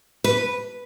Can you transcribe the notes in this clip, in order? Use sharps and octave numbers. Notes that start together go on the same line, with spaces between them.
B4